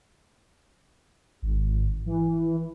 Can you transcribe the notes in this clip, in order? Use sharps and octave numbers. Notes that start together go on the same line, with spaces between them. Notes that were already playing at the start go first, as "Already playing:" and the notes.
G#1
E3